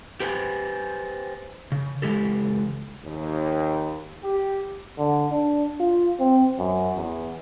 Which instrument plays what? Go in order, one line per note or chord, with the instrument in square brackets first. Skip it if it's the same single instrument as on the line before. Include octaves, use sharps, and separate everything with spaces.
[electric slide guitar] G4 B4 C5 G5 G#5
C#3
C#3 E3 G#3 G4 A4
[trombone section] D#2
G4
[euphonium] D3
D4
F4
C4
F#2
E2